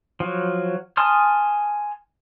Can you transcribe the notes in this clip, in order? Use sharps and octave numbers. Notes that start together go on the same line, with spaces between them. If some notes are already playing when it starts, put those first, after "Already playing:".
F3 F#3
G#5 A5 C6 D#6 F6